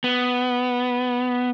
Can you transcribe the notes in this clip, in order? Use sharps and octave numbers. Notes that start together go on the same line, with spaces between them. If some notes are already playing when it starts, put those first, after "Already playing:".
B3